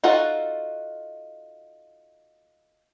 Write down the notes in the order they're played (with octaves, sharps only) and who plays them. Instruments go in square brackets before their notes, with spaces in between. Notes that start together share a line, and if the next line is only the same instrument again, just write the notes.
[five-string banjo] D#4 F4 F#4 A4 F#5